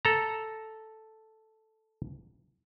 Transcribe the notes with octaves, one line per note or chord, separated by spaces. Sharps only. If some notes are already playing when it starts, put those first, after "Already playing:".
A4 A#5